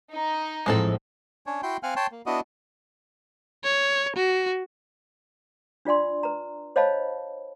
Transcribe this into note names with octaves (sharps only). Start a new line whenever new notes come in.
D#4
A2 F3 G#3 C4 A4
C#4 D4 C#5
E4 F#4 G5 C6
C4 F5 F#5 G#5 F6
C#5 G5 A5 C6
A#3
B3 D4 E4 F#4 D#5
C#5
F#4
D4 F4 D5 G#5 C6
B4 A#5
C5 C#5 D#5 F5 A5 B5